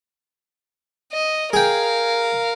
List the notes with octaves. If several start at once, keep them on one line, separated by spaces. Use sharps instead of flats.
D#5
G#4 A#4 F5 G5